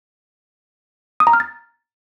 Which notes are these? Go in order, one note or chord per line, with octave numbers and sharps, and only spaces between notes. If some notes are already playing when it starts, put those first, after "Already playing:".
D#6
A#5
F6
A6